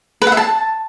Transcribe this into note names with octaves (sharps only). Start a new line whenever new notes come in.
B4
F#5
E5
A5